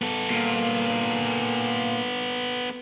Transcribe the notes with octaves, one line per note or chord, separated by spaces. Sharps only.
B3 A4
A#2